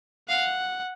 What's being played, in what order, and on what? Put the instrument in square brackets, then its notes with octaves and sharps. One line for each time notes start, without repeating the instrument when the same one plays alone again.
[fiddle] F5 [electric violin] F#5